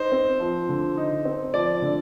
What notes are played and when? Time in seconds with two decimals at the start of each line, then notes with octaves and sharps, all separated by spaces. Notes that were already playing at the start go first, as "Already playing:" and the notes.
Already playing: D#4 C5
0.12 C4
0.40 F3
0.69 D3
0.97 D#4
1.25 C4
1.54 F3 D5
1.82 D3